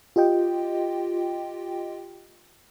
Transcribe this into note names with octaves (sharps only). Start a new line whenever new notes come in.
F4 G4 D#5 G5